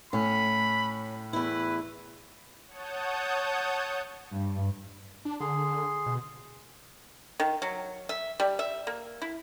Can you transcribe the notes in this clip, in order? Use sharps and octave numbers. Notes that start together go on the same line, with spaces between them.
A2 C#4 B5
E2 E4 B4
C#5 F#5 A5 D#6 G6
G2
D4
D3 G#4 C6
B2
D#3
F#3
E5
G3
E5
A#3
E4